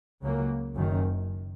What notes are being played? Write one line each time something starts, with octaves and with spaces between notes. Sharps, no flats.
C#2 C#3 F#3 A#3
F#1 F#2 D#3